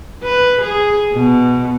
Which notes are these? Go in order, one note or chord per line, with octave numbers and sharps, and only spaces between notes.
B4
G#4
B2